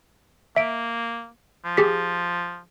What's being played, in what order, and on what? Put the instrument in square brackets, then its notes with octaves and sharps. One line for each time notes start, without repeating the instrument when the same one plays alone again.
[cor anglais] A#3 [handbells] E5 D7
[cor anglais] F3
[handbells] G4 G#4 B6